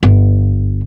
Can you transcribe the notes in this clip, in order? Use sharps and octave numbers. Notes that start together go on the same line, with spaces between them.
G1